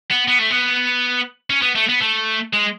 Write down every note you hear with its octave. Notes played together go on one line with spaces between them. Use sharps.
B3
B3
A3
B3
C#4
B3
A3
B3
A3
G#3